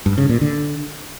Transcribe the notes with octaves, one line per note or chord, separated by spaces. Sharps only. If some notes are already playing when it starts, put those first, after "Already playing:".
G2
C#3
A#2
D3